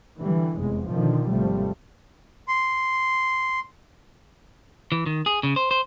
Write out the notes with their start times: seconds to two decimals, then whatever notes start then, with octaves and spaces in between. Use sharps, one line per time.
0.19 D3 E3 G3
0.57 F1 E2 G#3
0.89 B2 D3 D#3 F3
1.31 G#1 C3 F3 G3 A3
2.48 C6
4.92 E3
5.06 D#3
5.26 G#4
5.43 C#3
5.56 C5
5.71 C5